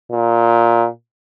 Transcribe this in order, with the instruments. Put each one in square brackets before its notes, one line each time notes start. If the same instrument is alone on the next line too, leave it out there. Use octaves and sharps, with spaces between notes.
[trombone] A#2